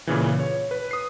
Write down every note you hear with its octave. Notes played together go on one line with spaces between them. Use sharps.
A#2 C#3 E3
C#5
B4
D#6 C7